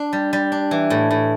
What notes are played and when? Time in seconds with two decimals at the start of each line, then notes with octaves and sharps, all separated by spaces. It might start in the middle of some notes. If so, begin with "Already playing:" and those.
Already playing: D4
0.13 G3
0.33 G3
0.52 D4
0.71 E3
0.90 A2
1.11 A2